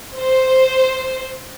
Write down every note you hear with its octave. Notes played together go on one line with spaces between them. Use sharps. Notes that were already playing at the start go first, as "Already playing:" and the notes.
C5